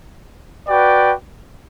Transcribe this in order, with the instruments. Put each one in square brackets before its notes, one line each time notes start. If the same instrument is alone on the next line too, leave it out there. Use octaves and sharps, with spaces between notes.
[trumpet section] F#4 B4 D5 G5